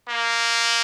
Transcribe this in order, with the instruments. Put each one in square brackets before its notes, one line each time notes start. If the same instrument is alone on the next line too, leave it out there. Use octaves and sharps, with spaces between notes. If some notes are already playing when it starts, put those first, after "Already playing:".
[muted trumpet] A#3